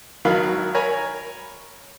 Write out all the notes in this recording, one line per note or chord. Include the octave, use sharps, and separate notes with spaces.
G#1 D#3 F#3 F5 B5
A#4 C#5 G#5 A#5 B5